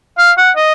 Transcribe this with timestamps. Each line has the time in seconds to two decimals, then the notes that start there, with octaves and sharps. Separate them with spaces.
0.19 F5
0.38 F#5
0.57 D#5